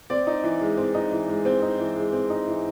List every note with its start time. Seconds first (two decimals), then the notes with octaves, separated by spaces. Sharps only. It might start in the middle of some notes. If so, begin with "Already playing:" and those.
0.10 C4 D5
0.27 D#4
0.44 E3
0.61 G#3
0.77 C4
0.94 D#4
1.12 E3
1.28 G#3
1.45 C4 C5
1.62 D#4
1.79 E3
1.96 G#3
2.13 C4
2.30 D#4
2.47 E3